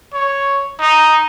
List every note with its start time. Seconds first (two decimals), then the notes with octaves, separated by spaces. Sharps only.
0.14 C#5
0.80 D#4